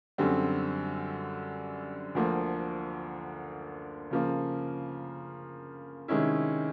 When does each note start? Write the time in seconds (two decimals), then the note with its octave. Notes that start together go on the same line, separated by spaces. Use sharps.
0.18 F#2 D3 G3 C4
2.15 D2 D3 F3 A#3
4.11 C#3 F3 A#3
6.08 C3 D#3 G#3 C#4 E4